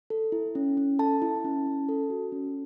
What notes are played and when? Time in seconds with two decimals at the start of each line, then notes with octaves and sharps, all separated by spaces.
0.10 A4
0.32 E4
0.55 C#4
0.77 C#4
0.99 A4 A5
1.22 E4
1.45 C#4
1.66 C#4
1.89 A4
2.10 F#4
2.32 C#4